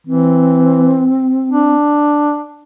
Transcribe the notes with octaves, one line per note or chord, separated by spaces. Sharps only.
E3 C4
D4